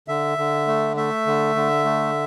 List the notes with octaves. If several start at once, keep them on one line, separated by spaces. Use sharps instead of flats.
D3 E5
D3
A3
A3 E5
D3
D3
A3